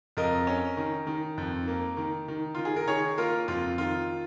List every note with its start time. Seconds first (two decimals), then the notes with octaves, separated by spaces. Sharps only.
0.17 F2 A#4 D#5
0.47 C#4
0.77 D#3
1.07 D#3
1.38 F2
1.68 A#3
1.97 D#3
2.28 D#3
2.55 D#3 F4
2.65 G#4
2.76 A#4
2.87 D#3 G#4 C#5
3.18 A#3 F4 A#4
3.48 F2 F4
3.78 D#3 F4